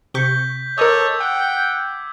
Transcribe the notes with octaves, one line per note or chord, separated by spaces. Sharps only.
C3 C#6 G6 B6 G7
A4 A#4 C#5 D#5 D6 E6 G#6
F#5 G5